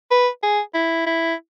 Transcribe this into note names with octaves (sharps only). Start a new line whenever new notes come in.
B4
G#4
E4
E4